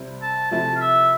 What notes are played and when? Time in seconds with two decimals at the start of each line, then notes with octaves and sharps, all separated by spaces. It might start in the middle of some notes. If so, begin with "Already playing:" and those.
Already playing: C3 G3 C4 E4
0.22 A5
0.51 C3 F3 A3 E4 A5
0.76 F5
0.81 E5